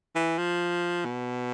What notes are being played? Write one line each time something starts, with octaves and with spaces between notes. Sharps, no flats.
E3
F3
B2